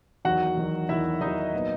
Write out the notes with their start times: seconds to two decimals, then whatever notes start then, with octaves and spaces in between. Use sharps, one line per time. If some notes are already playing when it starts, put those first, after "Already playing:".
0.25 E2 D#3 F#3 F#4 F#5
0.57 E2 D#3 F#3
0.89 E2 D#3 F#3 E4 E5
1.21 E2 D#3 F#3 D#4 D#5
1.53 A#2 F#3 B3